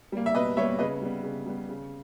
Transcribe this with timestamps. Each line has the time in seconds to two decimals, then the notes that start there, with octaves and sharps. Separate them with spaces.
0.12 G3 A#3
0.26 E5
0.34 B2 B4 D#5
0.57 G3 A#3 C#5 E5
0.79 C#3 B4 D#5
1.02 G3 B3
1.23 C#3
1.46 G3 B3
1.69 C#3